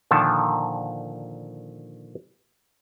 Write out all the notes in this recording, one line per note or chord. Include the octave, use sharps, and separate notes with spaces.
A#2 D3 D#3 F3 A5